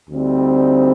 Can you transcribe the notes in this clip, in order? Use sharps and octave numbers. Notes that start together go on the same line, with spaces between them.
D2 D3 G3 C4 D#4